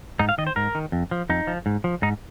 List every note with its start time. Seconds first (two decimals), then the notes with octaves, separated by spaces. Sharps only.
0.19 G#2 D#4
0.29 F5
0.38 D#3 D#5
0.47 C5
0.56 G#2 A#4
0.75 D#3
0.92 F2
1.11 F3
1.29 F2 D#4
1.47 F3
1.66 G#2
1.84 F3
2.02 G#2 D#4